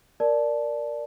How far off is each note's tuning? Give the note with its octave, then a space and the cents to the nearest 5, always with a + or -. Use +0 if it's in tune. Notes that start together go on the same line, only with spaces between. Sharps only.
A#4 +0 D5 +0 A5 -10